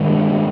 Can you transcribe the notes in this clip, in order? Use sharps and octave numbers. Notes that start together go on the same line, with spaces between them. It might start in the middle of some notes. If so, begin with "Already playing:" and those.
Already playing: G2 D#3 G#3